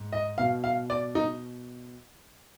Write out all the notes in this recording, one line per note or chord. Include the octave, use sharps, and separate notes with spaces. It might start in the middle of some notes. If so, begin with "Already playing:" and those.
Already playing: G#2
D#5
B2 F5
F5
D5
D#4